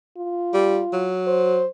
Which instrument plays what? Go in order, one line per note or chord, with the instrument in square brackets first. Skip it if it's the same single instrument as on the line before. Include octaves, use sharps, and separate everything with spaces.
[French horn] F4
[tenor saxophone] G3
F#3
[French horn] C5